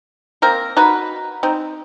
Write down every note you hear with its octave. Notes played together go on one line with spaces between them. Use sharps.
A#3 C4 A#4
D#4 F#4 B4
C4 D#4